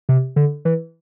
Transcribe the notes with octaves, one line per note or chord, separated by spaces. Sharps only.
C3
D3
E3